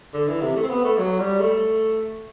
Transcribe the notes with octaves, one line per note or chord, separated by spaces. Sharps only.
D3
E3
C3
A3
C4
B3
A3
F#3
G3
A3